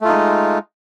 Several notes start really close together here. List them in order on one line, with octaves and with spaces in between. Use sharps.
A3 F4 D#4 G#3